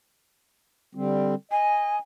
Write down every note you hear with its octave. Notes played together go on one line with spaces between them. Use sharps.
D3 G3 C4
D#5 G#5